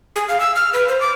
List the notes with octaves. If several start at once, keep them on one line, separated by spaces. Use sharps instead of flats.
G#4
F5
E6
F6
B4
C5
D6